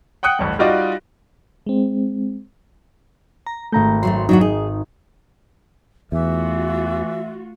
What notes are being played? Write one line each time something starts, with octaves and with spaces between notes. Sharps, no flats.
F#5 G5 D#6 F#6 C#7
A1 D2 G2
G3 D#4 F4 F#4 D5 D#5
G#3 C4
A#5
G#1 A3 A#5 G6
F#3 G3 A3 C6
F#3 D4 D#4 F#4
D#4 G#4
E2 E3 A3 F4 F#4 E5